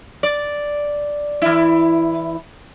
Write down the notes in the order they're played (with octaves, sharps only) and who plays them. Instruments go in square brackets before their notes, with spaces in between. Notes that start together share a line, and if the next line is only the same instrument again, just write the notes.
[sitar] D5
E3 E4